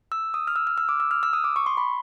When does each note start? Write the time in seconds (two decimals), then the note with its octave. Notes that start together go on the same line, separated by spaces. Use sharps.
0.12 E6
0.34 D#6
0.47 F6
0.56 E6
0.67 F6
0.78 E6
0.89 D6
1.00 E6
1.11 F6
1.23 E6
1.33 D#6
1.44 D6
1.56 C#6
1.66 C6
1.77 B5